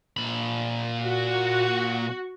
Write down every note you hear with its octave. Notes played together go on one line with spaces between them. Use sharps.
A#2 B5
F#4